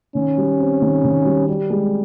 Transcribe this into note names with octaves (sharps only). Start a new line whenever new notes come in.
D#3 C#4
G3
C4
D#3
D#3
G3
G3 G4
G#3